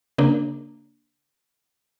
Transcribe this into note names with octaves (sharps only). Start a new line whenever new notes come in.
C#3 A#3 D4